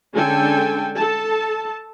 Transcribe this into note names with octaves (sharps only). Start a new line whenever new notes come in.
D3 G#3 C#4 A4 G5 G#5
A4 A5